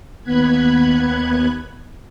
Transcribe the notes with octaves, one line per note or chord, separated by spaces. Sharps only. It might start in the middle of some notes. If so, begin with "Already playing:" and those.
D#2 B3 B5 F#6 G#6